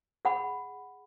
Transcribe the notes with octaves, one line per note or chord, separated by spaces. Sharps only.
G#4 F#5 B5